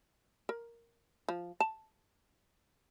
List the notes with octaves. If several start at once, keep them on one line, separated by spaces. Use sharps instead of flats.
A#4
F3
A5